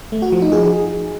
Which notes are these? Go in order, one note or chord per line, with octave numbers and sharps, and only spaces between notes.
A3
F#4
F3
D#4
G#4